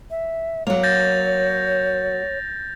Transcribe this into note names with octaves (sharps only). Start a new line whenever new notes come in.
E5
F#3 A#3 C#5 F7
G6 A6 A#6